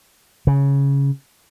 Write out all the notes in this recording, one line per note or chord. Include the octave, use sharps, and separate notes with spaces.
C#3